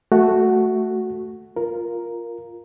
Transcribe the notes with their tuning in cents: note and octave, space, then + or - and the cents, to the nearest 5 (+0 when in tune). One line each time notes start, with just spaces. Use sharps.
A3 +0 F#4 +0
F4 +0 A#4 +0